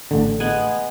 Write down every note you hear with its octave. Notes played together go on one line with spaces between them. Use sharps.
A1 D3
G#3 B3 G#5